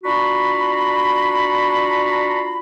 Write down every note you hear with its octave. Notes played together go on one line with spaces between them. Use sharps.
D4 F4 F#4 A#5 B5